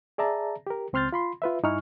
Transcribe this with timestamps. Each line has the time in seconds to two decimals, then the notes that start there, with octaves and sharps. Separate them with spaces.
0.18 G#4 D5 E5 A5 A#5
0.67 G4 A#4
0.93 C#2 C4 C6 F6 G6 A6
1.13 F4 B5 C6
1.42 F4 B4 E5
1.63 G2 D#4 E4 G#5 C#6 F6